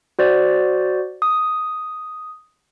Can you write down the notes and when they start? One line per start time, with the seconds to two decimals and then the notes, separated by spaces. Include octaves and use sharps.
0.19 F#4 C5 D5
1.22 D#6